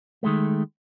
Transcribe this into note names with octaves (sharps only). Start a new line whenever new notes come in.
D#3 G#3 A3